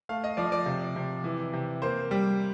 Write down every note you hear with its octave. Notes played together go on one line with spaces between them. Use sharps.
A3 F5
D#5
F3 D5
D5
C3
C3
E3
C3
A#3 C5
G3